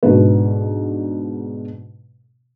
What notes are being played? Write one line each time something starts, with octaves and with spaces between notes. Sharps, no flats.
G#2 B2 D3 B4